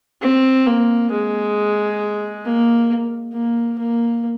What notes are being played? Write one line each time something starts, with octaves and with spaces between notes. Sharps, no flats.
C4
A#3
G#3
A#3
A#3
A#3